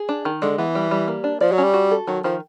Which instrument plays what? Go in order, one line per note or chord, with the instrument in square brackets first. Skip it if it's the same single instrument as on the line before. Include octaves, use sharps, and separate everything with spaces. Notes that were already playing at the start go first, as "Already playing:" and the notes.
Already playing: [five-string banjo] G#4
D4
D#3
[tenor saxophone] D3 [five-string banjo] G#3
[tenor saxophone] E3 [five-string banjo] B3
[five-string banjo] G3
G3
A#3
D4
[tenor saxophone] F3 [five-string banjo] D5
[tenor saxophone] F#3
[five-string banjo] C#4
[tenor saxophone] G3
[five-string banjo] F#4
A4
[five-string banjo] D#3 [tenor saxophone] F#3
[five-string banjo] D#3 [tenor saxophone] F3